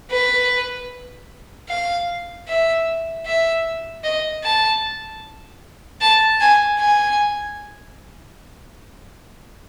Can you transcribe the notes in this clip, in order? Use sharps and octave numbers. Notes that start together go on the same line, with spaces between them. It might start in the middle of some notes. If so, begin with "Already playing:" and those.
B4
F5
E5
E5
D#5
A5
A5
G#5
G#5